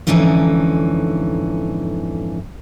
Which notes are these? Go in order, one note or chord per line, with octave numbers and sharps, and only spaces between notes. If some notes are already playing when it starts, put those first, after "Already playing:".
F2 G#2 D3 E3 C#4 D#4